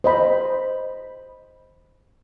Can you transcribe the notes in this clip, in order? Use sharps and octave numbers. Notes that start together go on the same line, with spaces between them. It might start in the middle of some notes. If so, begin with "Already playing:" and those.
C5 D#5 B5